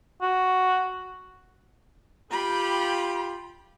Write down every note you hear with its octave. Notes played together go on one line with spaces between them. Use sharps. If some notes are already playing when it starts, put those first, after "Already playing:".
F#4
F4 G4 G5 B5